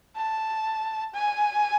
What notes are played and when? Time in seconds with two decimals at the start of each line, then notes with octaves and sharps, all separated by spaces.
0.16 A5
1.14 G#5